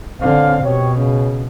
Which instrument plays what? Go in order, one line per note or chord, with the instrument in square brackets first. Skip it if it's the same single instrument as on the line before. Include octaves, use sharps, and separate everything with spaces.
[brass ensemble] A1 C#4 F5 [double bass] D3 C4
[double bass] B2 [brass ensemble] G4 C#5
[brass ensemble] C#3